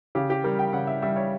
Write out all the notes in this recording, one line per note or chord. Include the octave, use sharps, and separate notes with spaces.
C#3 G4
G4
G3 A#4
G5
C#3 F#5
E5
G3 E5
C#5